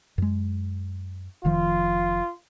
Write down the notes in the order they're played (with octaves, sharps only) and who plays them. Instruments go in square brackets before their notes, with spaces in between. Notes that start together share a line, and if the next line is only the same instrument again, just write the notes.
[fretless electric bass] F#2 G#3
[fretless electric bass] F1 D#3 F3 [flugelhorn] F4